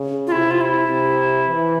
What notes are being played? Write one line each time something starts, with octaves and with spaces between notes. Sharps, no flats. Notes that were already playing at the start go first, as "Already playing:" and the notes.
Already playing: C#3
F4
C3 E4
F4
E4
C3
E3